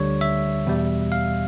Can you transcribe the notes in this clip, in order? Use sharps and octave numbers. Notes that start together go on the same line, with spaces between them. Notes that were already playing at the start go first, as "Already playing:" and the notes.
Already playing: D2 D3 G3 C#5
E5
E2 B2 G3
F5